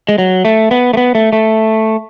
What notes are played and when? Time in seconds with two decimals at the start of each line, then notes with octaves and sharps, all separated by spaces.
0.09 G#3
0.18 F#3
0.45 A3
0.71 B3
0.93 A3
0.97 B3
1.15 A3
1.33 A3